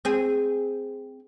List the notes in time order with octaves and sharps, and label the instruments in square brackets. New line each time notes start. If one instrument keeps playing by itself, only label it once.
[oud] C4 G#4